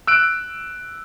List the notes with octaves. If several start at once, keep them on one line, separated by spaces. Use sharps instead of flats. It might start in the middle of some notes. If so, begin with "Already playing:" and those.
E6 F#6 D7